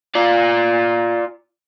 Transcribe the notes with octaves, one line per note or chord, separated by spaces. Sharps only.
F4 D5